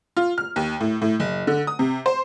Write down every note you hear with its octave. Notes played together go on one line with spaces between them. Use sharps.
F4
F6
D#2
A2
A2
F#1
D3
D#6
C3
C5